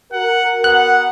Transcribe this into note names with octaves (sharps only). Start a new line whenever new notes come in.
F#4 A#4 F#5
B3 F#5 F#6